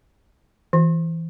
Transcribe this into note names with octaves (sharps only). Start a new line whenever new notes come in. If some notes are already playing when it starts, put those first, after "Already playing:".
E3